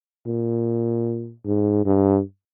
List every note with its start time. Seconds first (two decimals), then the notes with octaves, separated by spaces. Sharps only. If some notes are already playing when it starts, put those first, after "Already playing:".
0.26 A#2
1.46 G#2
1.85 G2